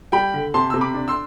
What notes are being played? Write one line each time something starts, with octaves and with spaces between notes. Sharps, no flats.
G3 G5 B5
D3
C3 A5 C6
C3 E6
B5 D6
D4
C6 E6